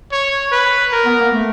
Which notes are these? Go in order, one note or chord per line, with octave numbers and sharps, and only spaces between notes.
C#5
B4
A#4
B3
A#3
A3